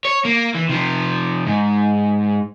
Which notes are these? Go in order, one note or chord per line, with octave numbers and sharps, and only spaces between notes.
C#5
A#3
E3
C3 F3
G#2